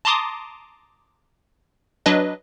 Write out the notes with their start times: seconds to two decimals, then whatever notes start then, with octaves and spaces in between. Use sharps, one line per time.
0.05 A5 A#5 C6 D6 D#6
2.06 F#3 D4 B4 D#5